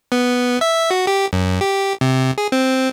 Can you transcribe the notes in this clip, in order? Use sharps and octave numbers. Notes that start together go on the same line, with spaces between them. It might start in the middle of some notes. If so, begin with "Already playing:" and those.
B3
E5
F#4
G4
F#2
G4
C3
G#4
C4